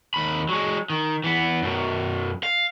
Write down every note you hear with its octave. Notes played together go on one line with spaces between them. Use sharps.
D#2 B5
F#3 G#3
D#3
E3 B3
F#2 B2
F5